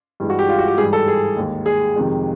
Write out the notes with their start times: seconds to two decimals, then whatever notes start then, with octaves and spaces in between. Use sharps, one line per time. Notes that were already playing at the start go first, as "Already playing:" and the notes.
0.20 G2 E3 G#3
0.30 F#4
0.39 G4
0.49 F4
0.59 F#4
0.68 G4
0.78 G#2 E3 G3 G#4
0.93 A4
1.08 G#4
1.37 D#2 D#3 G#3
1.66 G#4
1.96 F2 C3 D#3 G#3